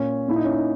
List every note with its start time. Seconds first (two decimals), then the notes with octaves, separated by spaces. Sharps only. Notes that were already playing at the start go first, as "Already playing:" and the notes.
Already playing: A#2 C#4
0.28 A#2 E4
0.36 D#4
0.45 C#4
0.53 D#4